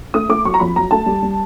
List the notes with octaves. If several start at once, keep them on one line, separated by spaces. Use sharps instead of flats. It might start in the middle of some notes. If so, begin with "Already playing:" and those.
A3 D#6
A3 D6
F#3 C#6
A#5
F2 B5
F#3 A#5
A3 A5
G3
G3